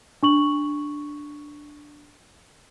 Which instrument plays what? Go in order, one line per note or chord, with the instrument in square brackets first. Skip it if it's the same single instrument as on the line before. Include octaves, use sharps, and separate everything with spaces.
[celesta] D4 C#6 F#7